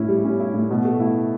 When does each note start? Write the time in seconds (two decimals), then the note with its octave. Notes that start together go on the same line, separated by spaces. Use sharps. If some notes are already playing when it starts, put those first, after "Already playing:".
Already playing: A2 C#4 E4
0.08 G3
0.25 C#4
0.40 E4
0.54 A2
0.71 B2
0.85 A3
1.00 E4